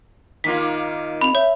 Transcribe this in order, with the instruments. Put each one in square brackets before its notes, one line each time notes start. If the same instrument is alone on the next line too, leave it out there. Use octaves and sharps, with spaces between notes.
[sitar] D#3 A#3 F4 [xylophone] B6
[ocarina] C4 [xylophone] B5 F7
[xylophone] C#5 [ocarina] E5